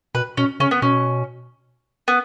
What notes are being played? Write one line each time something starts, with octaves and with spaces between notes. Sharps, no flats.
B2 B4
B2 C#4
C#3 C#4
B3
B2 C#4
B3